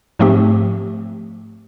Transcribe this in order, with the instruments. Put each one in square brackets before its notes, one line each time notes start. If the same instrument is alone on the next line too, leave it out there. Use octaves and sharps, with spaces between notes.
[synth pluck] G#2 F3 A3 C4 G4